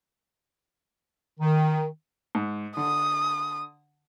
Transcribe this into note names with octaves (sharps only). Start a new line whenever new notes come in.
D#3
G#2
D3 D#6